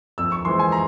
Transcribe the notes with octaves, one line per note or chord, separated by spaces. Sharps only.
F2 E6
C#6
E3 G#3 C4 C6
G#5
A#5